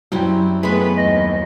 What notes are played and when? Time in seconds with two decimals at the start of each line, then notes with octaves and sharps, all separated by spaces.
0.12 F#2 G3 C4 E4 G5
0.63 G#3 A3 B3 B4 B5
0.97 D#2 D#5